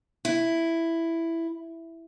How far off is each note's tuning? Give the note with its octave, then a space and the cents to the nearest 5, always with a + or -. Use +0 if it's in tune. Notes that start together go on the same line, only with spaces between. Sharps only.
E4 +5